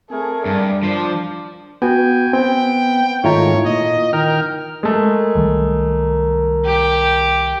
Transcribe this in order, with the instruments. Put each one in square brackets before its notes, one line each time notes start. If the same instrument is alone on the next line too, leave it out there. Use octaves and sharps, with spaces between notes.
[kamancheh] A3 G#4 [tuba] C4 [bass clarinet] A#4
[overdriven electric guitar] G2 [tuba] G3 [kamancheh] D5
[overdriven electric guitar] F3 C5 [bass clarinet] D4
[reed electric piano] B3 F#4 [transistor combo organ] G5 G#5
[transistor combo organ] B3 [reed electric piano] C4 [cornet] G5
[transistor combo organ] G#2 D#3 A3 [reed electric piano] E4 F4 A#5 [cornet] C#5
[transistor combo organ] A#2 [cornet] D#5
[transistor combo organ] D#3 G5 F6 [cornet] A#4
[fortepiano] G#3 A3 [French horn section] A#4
[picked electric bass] C2 D#3 G3
[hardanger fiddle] G4